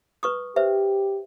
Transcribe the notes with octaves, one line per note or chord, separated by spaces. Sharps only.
B4 C#6 D#6
G4 B4 C5 E5